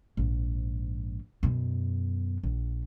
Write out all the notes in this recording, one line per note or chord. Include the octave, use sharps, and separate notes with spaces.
A#1 G#2
F#2 B2
A#1